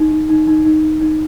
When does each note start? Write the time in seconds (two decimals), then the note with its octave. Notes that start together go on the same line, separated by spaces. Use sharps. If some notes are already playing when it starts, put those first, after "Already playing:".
Already playing: D#4
0.11 D#4
0.29 D#4
0.47 D#4
0.65 D#4
0.83 D#4
1.00 D#4